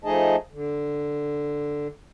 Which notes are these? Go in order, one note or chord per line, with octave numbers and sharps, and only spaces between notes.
F3 A3 D#4 G#4 D#5 A5
D3